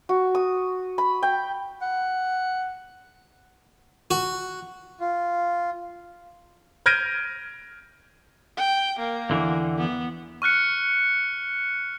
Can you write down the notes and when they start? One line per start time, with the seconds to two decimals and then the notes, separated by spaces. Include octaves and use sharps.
0.09 F#4
0.35 D#6
0.98 B5
1.23 G5
1.82 F#5
4.11 F#4
5.00 F4
6.86 F6 G6 G#6 A#6 D7 D#7
8.57 G5
8.99 A#3
9.30 E2 D3 E3
9.78 B3
10.42 C#6 F6 F#6 C#7